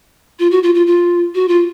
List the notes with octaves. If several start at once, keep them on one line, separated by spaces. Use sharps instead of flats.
F4
F#4
F4
F4
F4
F#4
F4